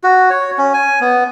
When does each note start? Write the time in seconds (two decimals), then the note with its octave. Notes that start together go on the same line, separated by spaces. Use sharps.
0.04 F#4
0.30 C#5
0.58 C#4
0.74 G#5
1.01 B3